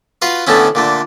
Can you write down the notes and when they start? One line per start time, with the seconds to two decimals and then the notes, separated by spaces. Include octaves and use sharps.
0.22 F4 F#4 B4 F5
0.47 A2 D3 A3 B3 C#4 E4
0.75 A#2 D3 A3